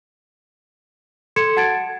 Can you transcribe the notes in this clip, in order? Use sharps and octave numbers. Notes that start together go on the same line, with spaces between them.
A4 C6 G#6 C#7 E7
F#4 F#5 A5 G#6 A6 D7